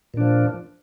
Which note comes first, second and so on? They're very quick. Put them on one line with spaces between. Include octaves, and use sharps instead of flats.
A#2 D4 F3